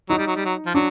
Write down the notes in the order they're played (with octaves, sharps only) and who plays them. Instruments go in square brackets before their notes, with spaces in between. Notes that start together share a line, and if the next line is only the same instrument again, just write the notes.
[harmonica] F#3 [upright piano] D#4
[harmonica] G3
F#3
G3
F#3
F3
[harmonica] F#3 [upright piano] D4